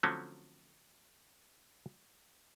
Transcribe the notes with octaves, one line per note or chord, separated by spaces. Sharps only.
D3 F3 F#3 A3 C4 C#4